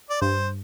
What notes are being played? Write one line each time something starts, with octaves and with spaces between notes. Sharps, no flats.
D5
G2 C5